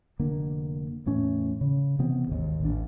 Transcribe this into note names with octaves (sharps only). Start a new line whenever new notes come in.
F1 D3 A#3
E2 A2 C#4
C#3
C3 E3 B3 C4
G#1 D#2
A1 D4